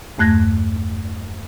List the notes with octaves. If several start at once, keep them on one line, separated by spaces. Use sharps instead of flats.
E2 G2 A3 F#6 G#6 A#6